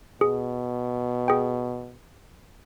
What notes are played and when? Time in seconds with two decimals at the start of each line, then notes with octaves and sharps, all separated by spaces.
0.21 B2 G#4
1.28 G#4 G5